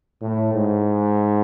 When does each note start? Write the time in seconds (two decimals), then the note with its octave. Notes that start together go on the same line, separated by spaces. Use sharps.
0.22 A2
0.54 G#2